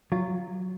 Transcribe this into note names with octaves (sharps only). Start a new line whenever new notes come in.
F#3 F4